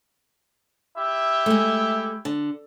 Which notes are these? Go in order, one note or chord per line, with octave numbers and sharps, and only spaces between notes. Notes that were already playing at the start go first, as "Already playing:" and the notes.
E4 G4 E5
G#3 A3
D3